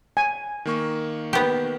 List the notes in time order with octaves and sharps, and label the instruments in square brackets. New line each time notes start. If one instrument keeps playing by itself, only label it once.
[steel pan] G#5
[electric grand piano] D#3 A#3 C#6
[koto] B3 G4